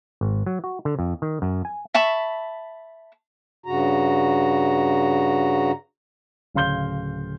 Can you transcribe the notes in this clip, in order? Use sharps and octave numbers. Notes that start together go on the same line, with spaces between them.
G#1
F#3
F#4
D3
F2
D#3
F#2
G#5
E5 A5 B5 C#6
G2 C#3 F#4 A#5
D1 C#3 F5 C6 G6 G7